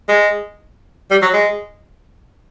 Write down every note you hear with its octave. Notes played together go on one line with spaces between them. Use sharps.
G#3
G3
F#3
G#3